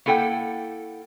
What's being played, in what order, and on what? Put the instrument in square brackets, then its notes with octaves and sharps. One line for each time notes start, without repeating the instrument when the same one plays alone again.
[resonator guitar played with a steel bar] A#3 E4 A4 F#5 G5